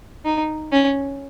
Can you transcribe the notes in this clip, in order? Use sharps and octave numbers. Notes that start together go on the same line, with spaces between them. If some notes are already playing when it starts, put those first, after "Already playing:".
D#4
C#4